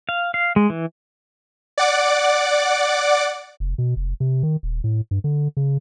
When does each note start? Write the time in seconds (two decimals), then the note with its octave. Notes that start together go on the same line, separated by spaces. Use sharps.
0.09 F5
0.34 F5
0.56 G#3
0.70 E3
1.78 D5 F#5 D6
3.60 F1
3.78 B2
3.96 F1
4.20 C3
4.43 D#3
4.63 D#1
4.84 A2
5.11 G2
5.24 D3
5.57 C#3